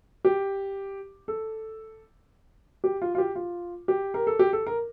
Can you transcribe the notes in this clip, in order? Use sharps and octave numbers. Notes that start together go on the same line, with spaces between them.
G4
A4
G4
F4
F4
G4
F4
G4
A#4
A4
G4
A4
A#4